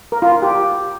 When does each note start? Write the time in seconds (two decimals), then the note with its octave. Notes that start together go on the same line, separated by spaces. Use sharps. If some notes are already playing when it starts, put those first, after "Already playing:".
0.12 A#4
0.22 F4
0.32 F4
0.42 G4